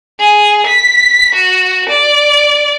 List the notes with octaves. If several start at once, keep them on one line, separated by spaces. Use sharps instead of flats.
G#4
B6
F#4
D5